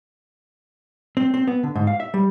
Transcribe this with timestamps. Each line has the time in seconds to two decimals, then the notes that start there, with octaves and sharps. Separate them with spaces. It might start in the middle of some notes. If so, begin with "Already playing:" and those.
1.17 C4
1.34 C4
1.47 B3
1.63 D3
1.75 G#2
1.87 F5
2.00 E5
2.14 G3